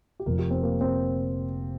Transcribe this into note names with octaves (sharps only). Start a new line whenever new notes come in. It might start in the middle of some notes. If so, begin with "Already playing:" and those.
G4
F1 F2 F3 A#4
G4
C4
A#3
C4